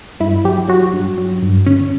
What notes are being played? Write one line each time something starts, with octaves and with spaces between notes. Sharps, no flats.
G2 E4
F#3 G4
F#3 F#4
G2
F#3
G2
D3 C#4